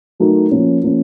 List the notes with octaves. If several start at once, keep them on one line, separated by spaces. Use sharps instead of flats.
F#3 A3 D#4 F#4 A#4
F3 A#3 C#4
F3 A#3 C#4